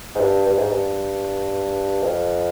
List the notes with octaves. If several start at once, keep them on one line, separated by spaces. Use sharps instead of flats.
G#2
G2
G2
G#2
G2
F2